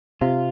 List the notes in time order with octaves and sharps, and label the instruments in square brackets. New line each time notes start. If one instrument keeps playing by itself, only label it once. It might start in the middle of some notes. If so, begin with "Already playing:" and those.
[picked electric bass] C3 [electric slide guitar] F4